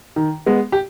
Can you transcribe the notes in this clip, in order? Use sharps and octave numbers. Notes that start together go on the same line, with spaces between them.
D#3
G#3 B3
G4